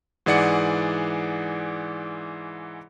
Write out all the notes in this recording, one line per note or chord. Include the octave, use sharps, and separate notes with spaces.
G#2 E3 G#4 D5 F#5 C#7